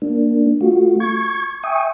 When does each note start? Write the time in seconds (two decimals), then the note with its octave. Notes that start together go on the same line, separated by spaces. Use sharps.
0.02 A#3 D4
0.61 A3 F4 F#4
1.00 C#6 G#6
1.63 E5 G5 G#5 C#6 D#6